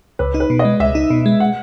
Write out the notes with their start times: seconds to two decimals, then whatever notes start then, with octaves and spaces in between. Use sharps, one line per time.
0.19 C#2 B4
0.34 D#4
0.40 B4
0.50 B2
0.59 D#5
0.65 G#3
0.80 C#2 E5
0.95 D#4
1.10 B2
1.26 G#3
1.40 F#5